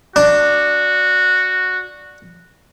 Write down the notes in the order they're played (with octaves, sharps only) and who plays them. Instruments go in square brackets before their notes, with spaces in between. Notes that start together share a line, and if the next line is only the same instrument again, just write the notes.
[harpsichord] D4 [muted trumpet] F#4